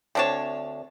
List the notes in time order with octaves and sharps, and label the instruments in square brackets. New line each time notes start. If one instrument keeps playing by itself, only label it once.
[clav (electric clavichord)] D2 A5 [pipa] C4 D4 C#5